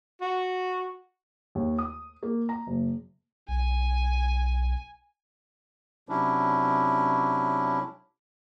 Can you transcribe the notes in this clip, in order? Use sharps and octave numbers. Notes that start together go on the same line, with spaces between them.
F#4
D#2
D#6
A#3
A#5
F#1
B1 G#5
C3 F#3 C#4 D4 E4